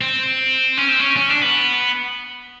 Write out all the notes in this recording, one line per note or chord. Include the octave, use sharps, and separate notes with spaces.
C4
C#4
C4
C#4
C#4
D4
B3